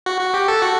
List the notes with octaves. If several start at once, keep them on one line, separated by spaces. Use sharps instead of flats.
F#4
F#4
G4
A4
F#4